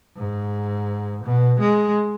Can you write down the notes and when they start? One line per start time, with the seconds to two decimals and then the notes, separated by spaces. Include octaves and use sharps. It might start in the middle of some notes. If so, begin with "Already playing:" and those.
0.17 G#2
1.24 B2
1.60 G#3